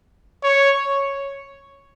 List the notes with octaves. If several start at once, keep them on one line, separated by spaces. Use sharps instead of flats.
C#5